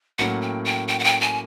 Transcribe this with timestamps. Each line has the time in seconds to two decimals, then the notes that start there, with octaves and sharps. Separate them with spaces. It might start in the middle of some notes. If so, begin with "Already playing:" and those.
0.18 A2 F#3 A#3 C#4 F#5
0.42 G5
0.65 G5
0.88 G5
0.99 F#5
1.04 G5
1.21 G#5